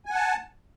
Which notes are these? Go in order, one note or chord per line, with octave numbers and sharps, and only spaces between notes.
F#5 G#5 A5